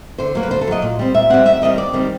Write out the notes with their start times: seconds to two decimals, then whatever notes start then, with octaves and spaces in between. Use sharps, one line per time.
0.18 D3 C5
0.35 F#3 A#3
0.43 B4
0.51 D3 C5
0.61 A4
0.67 F#3 A#3 D#5
0.82 A#2
0.99 G3 C4
1.14 A#2 E5
1.30 G3 C4 F#5
1.46 D#2 E5
1.62 D#3 G3 C4 D#5
1.78 D#2 D5
1.93 D#3 G3 C4